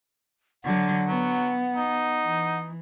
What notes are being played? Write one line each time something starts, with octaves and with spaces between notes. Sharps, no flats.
D3 F#3 F#5
F#3 B3
D#4
E3